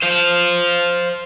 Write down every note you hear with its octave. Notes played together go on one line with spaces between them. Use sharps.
C5 F5